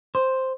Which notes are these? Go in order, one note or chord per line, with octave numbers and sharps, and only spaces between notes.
C5